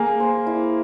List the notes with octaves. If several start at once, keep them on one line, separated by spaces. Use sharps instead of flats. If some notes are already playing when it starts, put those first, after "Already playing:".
Already playing: A#3 G#4
C5
E4